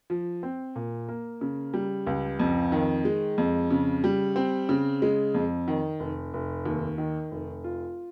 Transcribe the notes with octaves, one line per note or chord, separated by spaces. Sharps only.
F3
C4
A#2
A#3
C#3
G3
C#2
F2
D#3
G#3
F2
C#3
G3
C4
C#3
G#3
F2
D#3
F1
F1
D#2
D#3
F1
F4